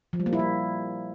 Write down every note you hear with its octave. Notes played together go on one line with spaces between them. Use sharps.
F3
G3
A#3
E4
A#3